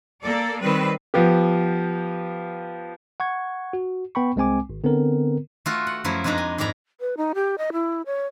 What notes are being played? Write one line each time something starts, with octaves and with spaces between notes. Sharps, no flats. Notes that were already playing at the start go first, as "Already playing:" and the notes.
A#3 A4 D5
D#3 G3 C4 B4
F3 B3 G4
F#5 C#6 G#6
F#4
B3 G5 B5 C#6
C2 G#3 C4 G#5 D6
G#1
D3 B3 C4 A#4
A3 F4 F#4
F#5
F#2 F3 F#3 A3 E4
F2 G#3 D4 D#4 A#5 B5
G#5
G#2 D#4 D5 G#5 A#5 B5
B4
D#4
G4
D#5
E4
C#5